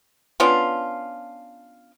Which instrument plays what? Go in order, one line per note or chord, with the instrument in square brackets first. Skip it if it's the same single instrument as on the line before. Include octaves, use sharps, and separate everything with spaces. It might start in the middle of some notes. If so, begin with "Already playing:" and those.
[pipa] B3 C#4 D4 F4